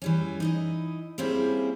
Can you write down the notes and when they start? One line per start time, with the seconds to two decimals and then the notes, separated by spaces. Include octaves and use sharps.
0.02 E3 G3 C#4
0.40 D#4 E4 D#5
1.18 G3 A#3 C4 C#4 E4 G#4